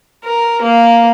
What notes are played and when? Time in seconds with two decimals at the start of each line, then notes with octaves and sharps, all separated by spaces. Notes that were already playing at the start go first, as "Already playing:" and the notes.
0.25 A#4
0.62 A#3